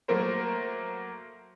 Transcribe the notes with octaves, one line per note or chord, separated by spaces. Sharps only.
F#3 A3 A#3 A#4 C5